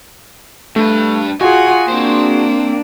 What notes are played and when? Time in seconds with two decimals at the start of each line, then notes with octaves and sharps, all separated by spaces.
0.76 G2 A3 B4
1.41 F4 F#4 G#4 F#5 G#5
1.88 A#3 C4 D4 C5